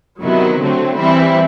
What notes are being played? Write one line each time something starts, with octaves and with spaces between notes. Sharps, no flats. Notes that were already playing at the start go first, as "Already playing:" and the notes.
C3 D#3 F#3 B3 E4
D3 F#3 A3 C4
E3 G3 C4 E4